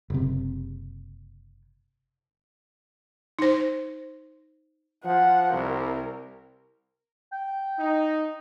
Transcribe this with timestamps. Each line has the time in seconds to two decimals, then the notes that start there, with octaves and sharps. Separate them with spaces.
0.10 F#1 C3
3.39 D#4 C5
5.05 F3 F#5
5.53 C2 A#4
7.32 G5
7.79 D#4